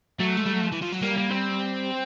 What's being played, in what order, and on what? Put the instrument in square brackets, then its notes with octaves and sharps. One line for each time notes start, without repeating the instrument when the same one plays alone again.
[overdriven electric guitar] F#3 [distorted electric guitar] A3
[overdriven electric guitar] G#3
G3
F#3
F3
E3
F3
F#3
[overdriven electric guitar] G3 [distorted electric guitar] A#3
[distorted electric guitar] A#3
C4